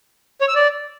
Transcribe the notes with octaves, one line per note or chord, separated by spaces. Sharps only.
C#5
E6
D5